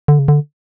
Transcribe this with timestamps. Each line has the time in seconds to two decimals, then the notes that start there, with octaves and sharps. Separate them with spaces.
0.08 D3
0.19 C#3
0.28 D3